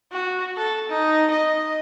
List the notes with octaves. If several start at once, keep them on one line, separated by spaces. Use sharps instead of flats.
F#4
A4
D#4
D#5